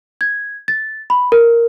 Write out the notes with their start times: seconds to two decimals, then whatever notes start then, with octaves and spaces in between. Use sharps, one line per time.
0.21 G#6
0.68 A6
1.10 B5
1.32 A#4